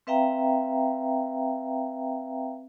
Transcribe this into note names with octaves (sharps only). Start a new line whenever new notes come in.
C4 B4 E5 F5 G5 A#5